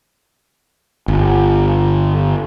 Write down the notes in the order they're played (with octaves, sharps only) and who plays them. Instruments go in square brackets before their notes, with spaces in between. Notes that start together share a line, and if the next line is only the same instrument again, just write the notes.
[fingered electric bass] G1